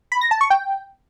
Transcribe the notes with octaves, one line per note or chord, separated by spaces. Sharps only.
B5
A#6
A5
C#6
G5